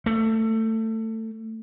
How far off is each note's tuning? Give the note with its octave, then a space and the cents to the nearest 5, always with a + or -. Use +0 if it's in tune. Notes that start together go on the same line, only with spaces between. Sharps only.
A3 +20